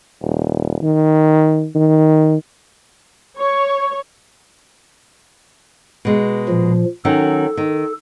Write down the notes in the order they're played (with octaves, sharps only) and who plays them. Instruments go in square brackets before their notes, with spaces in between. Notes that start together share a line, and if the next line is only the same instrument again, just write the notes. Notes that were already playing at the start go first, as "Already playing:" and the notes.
[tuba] D#1
D#3
D#3
[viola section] C#5
[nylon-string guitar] B2 G#3
[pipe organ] A#2 F3
[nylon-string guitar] D#3 F#3 C#4 [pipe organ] A4
[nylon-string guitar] D#3